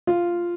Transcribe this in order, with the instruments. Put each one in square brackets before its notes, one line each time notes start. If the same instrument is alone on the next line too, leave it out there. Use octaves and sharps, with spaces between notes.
[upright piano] F4